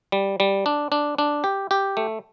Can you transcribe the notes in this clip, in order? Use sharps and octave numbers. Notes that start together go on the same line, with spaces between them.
G3
G3
D4
D4
D4
G4
G4
A3